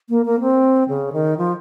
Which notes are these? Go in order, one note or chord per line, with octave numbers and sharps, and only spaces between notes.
A#3
A#3
C4
C#3
D#3
F3